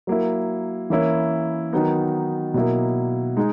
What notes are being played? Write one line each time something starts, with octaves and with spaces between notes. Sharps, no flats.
F#3 A#3 E4
E3 A#3 C#4 E4
D#3 F#3 B3 D#4
B2 F#3 A#3 E4
G#3 D#4